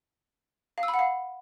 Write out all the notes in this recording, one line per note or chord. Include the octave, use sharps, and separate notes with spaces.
F5
E6
B5
F#5
F5